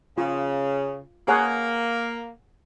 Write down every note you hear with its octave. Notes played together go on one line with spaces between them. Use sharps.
C#3 F4
A#3 G#4 C#5 F#5